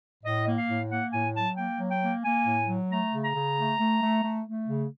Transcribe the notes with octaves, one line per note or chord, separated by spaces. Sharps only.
A2 D#5
A#3
F5
A2
A#3 F#5
A2 G#5
F#3 A5
A#3 G5
F#3
G5
A#3
A#3 G#5
A2
F#3
A3 A#5
C#3
A#5
C#3
A3
A3
A3
A3
A3
C#3